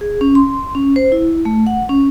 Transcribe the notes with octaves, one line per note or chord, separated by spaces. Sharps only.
G#4
C#4
C6
C#4
C5
E4
A3
F#5
C#4